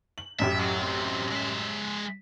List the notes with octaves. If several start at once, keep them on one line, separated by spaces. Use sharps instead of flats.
F#7
A1 F#2 G4 E5
F#3
F#3 C4
G#3 E5